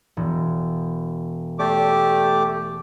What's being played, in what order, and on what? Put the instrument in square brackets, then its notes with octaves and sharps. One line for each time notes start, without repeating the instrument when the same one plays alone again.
[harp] E1
[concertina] A3 G4 D6 [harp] D5 A6 C7